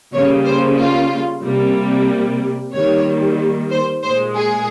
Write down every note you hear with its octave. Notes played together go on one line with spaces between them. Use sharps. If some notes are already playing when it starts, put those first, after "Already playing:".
C#3 G3 A#3 C#5
C5
F4
C3 G3 A#3
D#3 G3 A#3 C#5
C5
A#2 G#3 C5
G#4